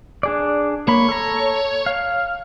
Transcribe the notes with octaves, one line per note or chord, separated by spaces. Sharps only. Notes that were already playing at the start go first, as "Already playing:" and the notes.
D4 G#4 D5
A#3 C#5 B5
A4 A#5
F5